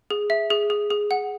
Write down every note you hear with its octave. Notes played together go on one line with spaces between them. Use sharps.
G#4
E5
G#4
G#4
G#4
F#5